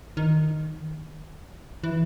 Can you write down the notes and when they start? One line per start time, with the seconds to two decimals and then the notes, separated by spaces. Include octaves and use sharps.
0.17 D#3
1.84 E3